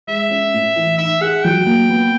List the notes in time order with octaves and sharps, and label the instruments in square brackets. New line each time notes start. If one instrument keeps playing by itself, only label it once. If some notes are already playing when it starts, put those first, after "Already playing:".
[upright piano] G#3 [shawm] E5
[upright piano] C#4
A2
E3
[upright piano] D#4 [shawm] E5
[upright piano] G#4 [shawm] F#5
[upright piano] F#3 [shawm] G5
[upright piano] A#3
B3